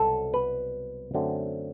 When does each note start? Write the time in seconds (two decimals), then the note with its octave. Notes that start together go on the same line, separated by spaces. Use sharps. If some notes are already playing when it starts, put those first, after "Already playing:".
Already playing: C2 B2 F#3 B3 A4
0.34 B4
1.14 F#2 D3 F#3 A3 C4